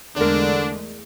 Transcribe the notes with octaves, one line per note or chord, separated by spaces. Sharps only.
E2 D3 G#3 A3 D4 A#4 D5